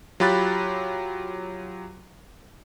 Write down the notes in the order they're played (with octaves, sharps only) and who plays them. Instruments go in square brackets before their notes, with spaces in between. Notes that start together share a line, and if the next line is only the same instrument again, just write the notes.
[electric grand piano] F#3 F4 G4 B5 F#6 A6